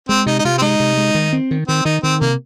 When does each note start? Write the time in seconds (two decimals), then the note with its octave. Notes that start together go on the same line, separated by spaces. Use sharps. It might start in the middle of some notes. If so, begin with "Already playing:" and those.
0.09 G#3 C4
0.26 C3 D#4
0.39 D#4
0.45 C3 F4
0.58 C4
0.62 G#3 D#4
0.80 C3
0.97 G#3
1.15 D#3
1.33 C4
1.51 D#3
1.68 D#3 C4
1.85 D#3 D#4
2.03 D#3 C4
2.20 C3 A#3